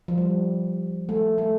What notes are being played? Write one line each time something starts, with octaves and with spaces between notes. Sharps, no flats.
F3
G3
A3
A3